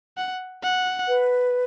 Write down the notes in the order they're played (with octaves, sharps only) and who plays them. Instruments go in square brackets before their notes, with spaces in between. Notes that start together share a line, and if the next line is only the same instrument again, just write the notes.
[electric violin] F#5
F#5
[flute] B4